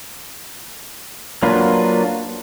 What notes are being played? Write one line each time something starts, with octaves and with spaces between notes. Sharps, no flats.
F#3 A#3 D4 F4 B4